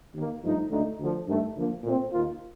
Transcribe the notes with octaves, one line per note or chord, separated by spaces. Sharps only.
D#2 D#3 A#3
G2 F3 A3 D#4
D2 D3 A3 D#4
D2 D3 F3
G2 D#3 A3
D3 F3 A#3
A#2 A3 C4
D#2 D#3 A#3 F4